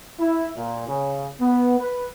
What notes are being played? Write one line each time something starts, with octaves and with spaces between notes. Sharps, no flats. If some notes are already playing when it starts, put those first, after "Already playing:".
E4
A#2
C#3
B3
B4